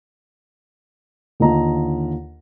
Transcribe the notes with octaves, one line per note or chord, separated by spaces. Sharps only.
D#2 D3 F4 D#5 A5 A#5